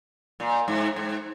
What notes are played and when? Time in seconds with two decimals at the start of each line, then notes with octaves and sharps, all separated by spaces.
0.40 A#2
0.68 G#2
0.96 G#2